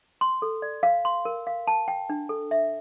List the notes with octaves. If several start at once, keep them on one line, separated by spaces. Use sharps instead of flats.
C6
A4
D5
F5
C6
A#4
F5
A5
G5
D4
A4
E5